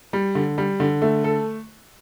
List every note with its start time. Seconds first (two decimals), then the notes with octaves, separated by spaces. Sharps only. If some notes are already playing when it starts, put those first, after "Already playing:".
0.13 G3
0.35 D3
0.58 G3
0.80 D3
1.02 A3
1.24 A4